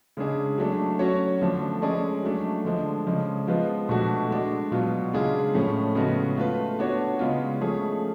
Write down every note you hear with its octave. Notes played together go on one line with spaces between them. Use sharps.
C#3 G#3 D4 G#4
F#3 A3 D4
F#3 C#4 F#4 C#5
D3 F3 A3 D4
G#3 C#4 G#4 D5
F#3 A3 D4
D3 F3 G#3 D4
C#3 F3 G#3
F3 G#3 B3 F4 B4
B2 A3 D4 F#4
G#3 D4 F#4
B2 F#3 B3 F4
C#3 G#3 D4 F4 G#4
A2 F3 A3 C#4
C#3 G#3 B3 F#4
A3 F4 B4
B3 D4 F#4 C#5
C#3 G#3 B3 F4
F3 A3 C#4 G#4